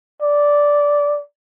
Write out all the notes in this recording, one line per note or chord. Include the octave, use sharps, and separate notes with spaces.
D5